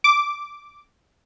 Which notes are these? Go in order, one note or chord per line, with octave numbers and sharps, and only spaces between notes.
D6